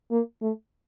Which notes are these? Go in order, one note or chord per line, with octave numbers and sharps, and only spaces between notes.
A#3
A3